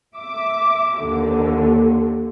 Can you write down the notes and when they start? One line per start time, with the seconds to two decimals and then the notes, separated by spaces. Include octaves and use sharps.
0.15 E5 D6
0.99 D#2 D3